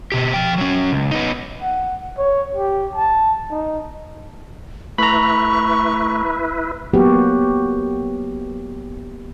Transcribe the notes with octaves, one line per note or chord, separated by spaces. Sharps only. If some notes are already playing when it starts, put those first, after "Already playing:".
B2 G4
F3 G5
F#3 C#4
C#2
B3 D#4
F#5
C#5
G4
A5
D#4
A3 E4 B4 A#5 B5 C#6
F#3 A#3 B3 F#4 G4